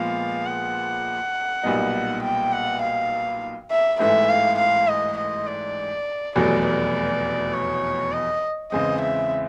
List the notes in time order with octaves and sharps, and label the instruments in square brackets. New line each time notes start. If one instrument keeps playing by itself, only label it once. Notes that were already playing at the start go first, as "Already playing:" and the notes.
Already playing: [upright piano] A#2 F3 G#3 B3 [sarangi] F5
[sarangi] F#5
[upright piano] B1 A#2 G3 B3 D#4
[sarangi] G5
F#5
F5
E5
[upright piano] A1 G#2 E3 A3 [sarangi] E5
[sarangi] F5
F5
D#5
D#5
D5
[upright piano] F1 E2 B2 F#3 A3 [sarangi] D5
[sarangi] D5
C#5
D#5
[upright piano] E2 C#3 E3 G#3 C4 [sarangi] D#5
[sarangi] E5